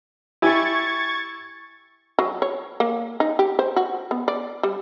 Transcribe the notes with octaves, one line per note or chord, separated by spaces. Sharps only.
E4 G4 G#5 C#6 G#6 A6
F#3
C#5
A#3
D#4
G4
C5
F#4
B3
D5
G3